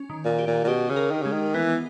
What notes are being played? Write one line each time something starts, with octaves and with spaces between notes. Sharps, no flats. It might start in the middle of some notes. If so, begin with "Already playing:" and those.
Already playing: C#4
D#3
A#2
G4
A#2
A#2
B2 G4
C#3
A#4
D#3
C#3 G#3
D#3
E3 B3